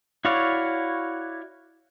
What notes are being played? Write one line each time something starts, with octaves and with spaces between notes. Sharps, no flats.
E4 F#4 C#5 D5 F5